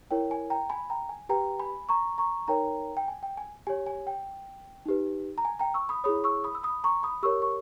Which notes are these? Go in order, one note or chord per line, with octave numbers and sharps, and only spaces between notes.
E4 A#4 C#5 G5
G#5
G5 A#5
G#5 B5
G5 A#5
G#5
G4 B4 G5 A#5
G#5 B5
A#5 C#6
A#5 C#6
D#4 A#4 C#5 G5 A#5
G5
G#5
G5
G#5
G4 C#5 G#5
G#5
G5
D#4 G4 B4
A#5
G#5
G5 A#5
C#6 E6
B5 D#6
E4 G#4 C#5 B5 D#6
C#6 E6
B5 D#6
E6
B5 D#6
A#5 C#6
B5 D#6
G4 A#4 C#5 C#6 E6
C#6